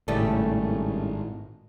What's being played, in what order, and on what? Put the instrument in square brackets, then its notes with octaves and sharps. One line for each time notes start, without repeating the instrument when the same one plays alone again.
[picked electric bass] G#1 [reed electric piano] A2 E4 A5 [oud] C#3 G3 A3